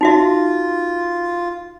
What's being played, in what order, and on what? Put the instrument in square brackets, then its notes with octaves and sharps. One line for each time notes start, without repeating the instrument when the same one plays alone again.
[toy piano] D#4 F#4 E5 [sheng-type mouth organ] F4